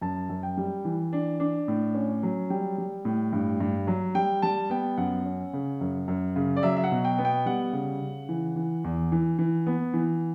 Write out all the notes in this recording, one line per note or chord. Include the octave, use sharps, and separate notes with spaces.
F#2 A5
F#2
G5
G3
E3
D4
D4
A2
C#4
F#3
G3 G5
G3
A2
G2
G2
F#3
G3 G5
G3 A5
B3 G5
F#2 F#5
C#4
C#3
F#2
F#2
C#3
D5
F#3 E5
E5
F#5
B2
G5
B3
G5
G3 F#5
C#3
C#3
E3
E3
E2
E3
E3
B3
E3